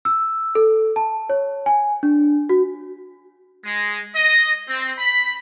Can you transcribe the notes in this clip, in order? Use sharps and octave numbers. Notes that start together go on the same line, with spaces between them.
E6
A4
A5
C#5
G#5
D4
F#4
G#3
D#5
C4
B5